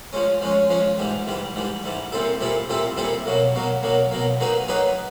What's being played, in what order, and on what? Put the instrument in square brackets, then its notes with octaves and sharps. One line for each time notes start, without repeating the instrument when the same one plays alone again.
[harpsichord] F3 G#3 C#4
F3 G#3 C#4
F3 G#3 C#4
G#2 E3 G3
G#2 E3 G3
G#2 E3 G3
G#2 E3 G3
A#2 G3 C4 E4 A4
A#2 G3 C4 E4 A4
A#2 G3 C4 E4 A4
A#2 G3 C4 E4 A4
B2 F#3 A#3
B2 F#3 A#3
B2 F#3 A#3
B2 F#3 A#3
F#3 A#3 D#4 G#4 B4
F#3 A#3 D#4 G#4 B4